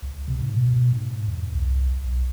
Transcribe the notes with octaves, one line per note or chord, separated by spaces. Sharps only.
C#2
C3
G#2
B2
G#2
E2
C2
B1